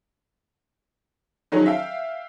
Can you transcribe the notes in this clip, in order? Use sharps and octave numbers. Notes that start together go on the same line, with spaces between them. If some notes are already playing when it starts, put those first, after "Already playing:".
D#3 F3 F#3 C#4 D#4 G#4
E5 F5 G5